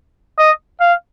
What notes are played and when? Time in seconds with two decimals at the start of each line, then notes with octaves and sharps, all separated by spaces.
0.39 D#5
0.81 F5